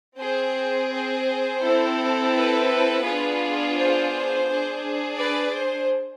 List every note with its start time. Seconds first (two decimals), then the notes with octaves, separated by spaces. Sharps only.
0.18 C4 G#4 C5
0.90 C5
1.61 C4 E4 A4
2.33 B4
3.04 B3 D4 F4 G#4
3.75 C5
4.47 D4 G#4
5.18 B4 D5
5.54 C5